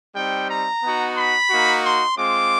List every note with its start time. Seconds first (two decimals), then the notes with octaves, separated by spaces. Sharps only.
0.16 G3 C4 D#4 G5
0.50 A#5
0.83 B3 D#4 F#4
1.17 B5
1.50 A#3 D#4 F#4
1.85 C6
2.18 G#3 C4 F4 D6